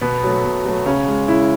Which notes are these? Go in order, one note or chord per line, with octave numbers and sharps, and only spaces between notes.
B2 B3
F#3 A3
B2
F#3 A3
C#3 C#4
G#3
C#3 E4